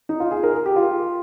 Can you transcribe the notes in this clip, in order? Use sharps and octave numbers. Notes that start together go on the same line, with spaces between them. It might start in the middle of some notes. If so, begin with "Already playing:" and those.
D#4
F4
G#4
A#4
G#4
G4
F4